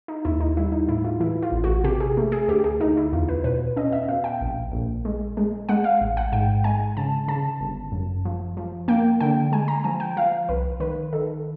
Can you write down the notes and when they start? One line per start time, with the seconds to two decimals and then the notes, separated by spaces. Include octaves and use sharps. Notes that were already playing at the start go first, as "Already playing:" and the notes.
0.08 D#4
0.25 D#2 E4
0.41 D#4
0.57 G3 E4
0.72 D#4
0.88 A2 E4
1.04 F4
1.20 E3 E4
1.43 F4
1.52 A1
1.64 F#4
1.84 C3 G4
2.00 G#4
2.17 A3
2.32 G#4
2.48 D2 G4
2.64 G#4
2.80 D2 D#4
2.97 E4
3.13 E2 F4
3.29 B4
3.44 B2 B4
3.76 C#4 D#5
3.92 E5
4.08 B2 F5
4.24 G5
4.41 A#1
4.72 A#1
5.05 G#3
5.37 G#3
5.69 G#3 F#5
5.84 F5
6.01 A1
6.17 F#5
6.32 G#2 G5
6.64 G#3 G#5
6.97 C#3 A5
7.28 C#3 A5
7.60 G1
7.92 F#2
8.25 F3
8.57 F3
8.88 A#3 G5
9.20 D3 G5
9.52 G#3 G#5
9.68 A#5
9.84 F3 G#5
10.00 G5
10.17 F3 F5
10.49 C2 B4
10.80 D#3 B4
11.13 D#3 A4